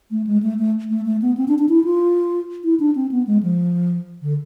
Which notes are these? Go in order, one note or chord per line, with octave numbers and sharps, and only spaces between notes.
A3
G#3
A3
A3
A3
A3
B3
C4
D4
D4
E4
F4
E4
D4
C4
B3
G#3
F3
D3